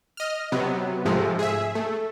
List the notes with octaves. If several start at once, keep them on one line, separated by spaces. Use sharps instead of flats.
D#5 F6
C3 F#3 B3
G#2 C3 F3 G#3 A3
G#4 E5
A3